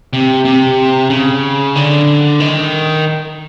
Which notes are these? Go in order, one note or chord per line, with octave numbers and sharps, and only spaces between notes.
C3
C3
C#3
D3
D#3